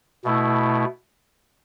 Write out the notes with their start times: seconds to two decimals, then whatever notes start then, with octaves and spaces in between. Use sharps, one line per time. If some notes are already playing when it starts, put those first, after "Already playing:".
0.24 B2 A3 E4